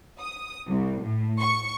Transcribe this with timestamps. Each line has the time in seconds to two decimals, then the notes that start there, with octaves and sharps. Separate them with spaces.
0.19 D#6
0.69 C2
1.05 A2
1.40 C#6